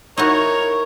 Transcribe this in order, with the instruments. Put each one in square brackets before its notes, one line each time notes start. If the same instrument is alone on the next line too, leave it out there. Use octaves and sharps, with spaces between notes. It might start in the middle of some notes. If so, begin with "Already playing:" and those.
[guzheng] D#4 E4 F#4 [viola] A#4 [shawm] C#5